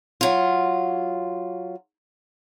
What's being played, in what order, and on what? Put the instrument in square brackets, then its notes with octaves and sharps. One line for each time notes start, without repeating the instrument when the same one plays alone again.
[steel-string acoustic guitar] F#3 F4